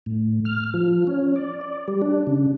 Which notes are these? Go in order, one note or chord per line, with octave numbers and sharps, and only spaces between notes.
A2
F6
F3
C#4
D5
D5
G3
D4
C#3